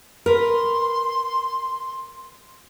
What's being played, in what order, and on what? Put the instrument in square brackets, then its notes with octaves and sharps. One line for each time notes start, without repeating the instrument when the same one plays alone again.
[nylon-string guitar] A#4 B4 [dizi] C6